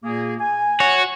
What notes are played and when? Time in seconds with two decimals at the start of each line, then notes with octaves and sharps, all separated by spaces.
0.03 A#2 A#3 G#4
0.40 G#5
0.80 F#4 C#5